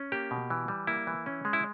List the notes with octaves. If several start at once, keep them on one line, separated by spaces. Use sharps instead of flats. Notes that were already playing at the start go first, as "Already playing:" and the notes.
Already playing: C#4
A#3 G4
B2
E3
G3
A#3 E4
E3
C#4
G#3
E4